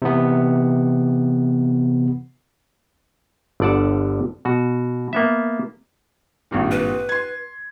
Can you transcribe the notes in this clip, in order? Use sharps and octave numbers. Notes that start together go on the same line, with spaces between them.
C3 E3 B3
G1 D3 D5 F#5 A5
B2 F#4
A#3 B3 E5
G#1 G2 A#2
B4
C6 G#6